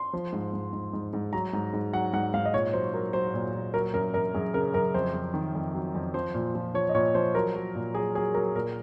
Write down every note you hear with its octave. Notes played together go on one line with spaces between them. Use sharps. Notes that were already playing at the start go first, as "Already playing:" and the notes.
Already playing: C6
F3
G#2
G#2
G#2
G#2
G#2
F#3 A#5
G#2
G#2
F#3 F#5
G#2 F#5
G#2 F5
D#5
A#2 C#5
F#3 C5
F#3 A#4
F#3 C5
A#2
A#2
F#3 A#4
F#2 A#4
F#2 A#4
F#2 G#4
C#3 A#4
F#2 A#4
F2 C5
F2
D#3
F2
F#3
F2
F3 C5
A#2
F3
F3 C#5
D#5
A#2 C#5
F3 C5
F#3 A#4
F#3
A#2
F#3 G#4
F#3 G#4
F#3 A#4
A#2 A#4